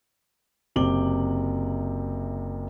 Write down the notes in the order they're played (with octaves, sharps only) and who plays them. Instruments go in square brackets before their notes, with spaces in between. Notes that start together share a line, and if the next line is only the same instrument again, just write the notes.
[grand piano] F#1 C3 D6 F#7 G7